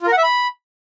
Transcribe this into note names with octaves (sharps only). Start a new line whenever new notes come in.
F4
A#4
F#5
E5
B5